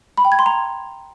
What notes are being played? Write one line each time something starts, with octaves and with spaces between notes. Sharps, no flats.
B5
G5
G#6
C6
A#5